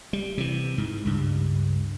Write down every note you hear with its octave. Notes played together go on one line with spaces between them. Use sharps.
G3
C3 E3
G#2
C#2 G2